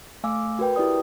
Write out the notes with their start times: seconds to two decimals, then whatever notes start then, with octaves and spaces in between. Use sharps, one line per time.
0.24 A3 F5 G#5 D6 E6
0.59 F#4 A#4 B4 G5
0.76 E4 G4 D5 D#6